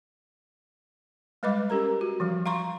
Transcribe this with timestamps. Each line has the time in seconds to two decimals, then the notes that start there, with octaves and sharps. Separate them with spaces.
1.43 G3 G#3 B4 D#5 B5 D6
1.70 C#4 G4 A#4 A#5
2.01 F#4
2.20 E3 F3 G3
2.46 F5 A#5 C6 C#6